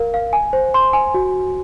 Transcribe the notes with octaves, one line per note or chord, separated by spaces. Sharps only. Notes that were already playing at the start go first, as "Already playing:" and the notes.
Already playing: A#4 F5
F5
G#5
C5
C6
G#5
F#4